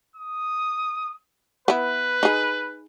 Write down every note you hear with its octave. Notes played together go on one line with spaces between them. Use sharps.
D#6
B3 E4 B4
D#4 G#4